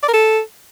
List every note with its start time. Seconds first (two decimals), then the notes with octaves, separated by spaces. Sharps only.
0.03 D5
0.08 A#4
0.13 A4